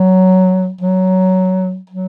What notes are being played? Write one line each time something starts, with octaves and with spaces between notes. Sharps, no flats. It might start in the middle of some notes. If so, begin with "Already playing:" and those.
Already playing: F#3
F#3
F#3